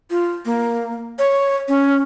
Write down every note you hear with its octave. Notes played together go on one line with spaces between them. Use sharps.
F4
A#3
C#5
C#4